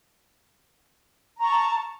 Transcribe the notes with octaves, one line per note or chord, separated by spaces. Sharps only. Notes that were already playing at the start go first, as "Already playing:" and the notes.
A5 A#5 C#6